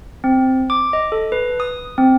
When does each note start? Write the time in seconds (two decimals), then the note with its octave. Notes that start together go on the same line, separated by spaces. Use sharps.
0.24 C4
0.70 D6
0.93 D#5
1.12 A4
1.32 B4
1.60 D#6
1.98 C4